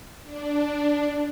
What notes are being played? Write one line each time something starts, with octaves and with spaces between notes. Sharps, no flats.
D4